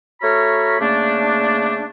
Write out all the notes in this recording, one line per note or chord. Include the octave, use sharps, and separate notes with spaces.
A3 F#4 C#5 A#5 B5 F6
C#3 A3 A#3 D4